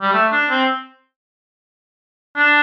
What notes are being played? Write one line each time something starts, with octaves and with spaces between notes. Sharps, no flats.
G3
A3
D4
C4
D4